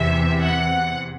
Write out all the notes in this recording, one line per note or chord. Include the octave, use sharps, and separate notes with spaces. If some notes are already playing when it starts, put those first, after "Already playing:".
Already playing: E2 C3 E3 E5
F#5